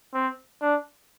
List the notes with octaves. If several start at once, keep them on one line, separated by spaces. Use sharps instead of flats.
C4
D4